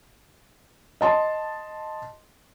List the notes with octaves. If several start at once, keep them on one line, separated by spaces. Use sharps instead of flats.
D#5 A5 C6